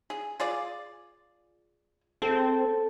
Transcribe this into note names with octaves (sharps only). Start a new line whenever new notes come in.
G#4
F4 G#4 D5
C4 A4